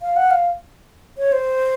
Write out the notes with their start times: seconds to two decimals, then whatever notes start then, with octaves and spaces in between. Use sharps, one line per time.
0.02 F5
0.16 F#5
0.31 F5
1.18 C#5
1.32 C5